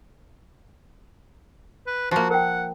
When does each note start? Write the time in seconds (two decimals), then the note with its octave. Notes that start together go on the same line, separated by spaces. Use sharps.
1.87 B4
2.11 F3 A#3 F#4
2.31 A#4 F#5 G5